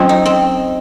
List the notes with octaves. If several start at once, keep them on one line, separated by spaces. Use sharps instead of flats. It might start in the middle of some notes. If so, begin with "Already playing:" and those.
Already playing: F#3 C4 C#4 F4 C5 D#5
D#4
C4